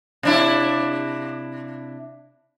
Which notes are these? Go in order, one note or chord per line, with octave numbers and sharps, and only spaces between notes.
C3 D4 E4